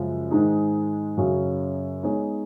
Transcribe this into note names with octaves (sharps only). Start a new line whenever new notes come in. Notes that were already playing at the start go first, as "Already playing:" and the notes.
Already playing: F#2 C#3 F3 G#3
G#2 D#3 G#3 D#4 G#4
F#2 C#3 F#3 C#4 G#4
G#3 B3 D#4 G#4 C#5